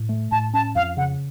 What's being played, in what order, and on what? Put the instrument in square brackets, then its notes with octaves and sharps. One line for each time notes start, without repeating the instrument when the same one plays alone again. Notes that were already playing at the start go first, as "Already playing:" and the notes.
Already playing: [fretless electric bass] A2
A3
[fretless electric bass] A2 [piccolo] A5
[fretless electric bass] C#4 [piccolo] A5
[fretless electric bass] F2 [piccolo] F5
[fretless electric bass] C#3 [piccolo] F#5